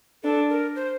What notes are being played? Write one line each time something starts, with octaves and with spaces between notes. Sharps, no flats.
D4 A4
A#4
C5